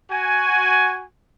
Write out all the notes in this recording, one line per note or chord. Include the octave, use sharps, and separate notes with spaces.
F#4 G#5